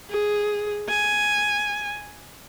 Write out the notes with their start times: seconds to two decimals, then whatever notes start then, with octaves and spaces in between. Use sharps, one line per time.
0.10 G#4
0.89 G#5